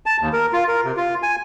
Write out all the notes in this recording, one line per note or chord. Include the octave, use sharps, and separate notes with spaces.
A5
D#2
A#4
F4
A#4
C3
F4
G#5